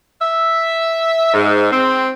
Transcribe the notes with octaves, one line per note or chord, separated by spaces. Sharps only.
E5
G#2
C4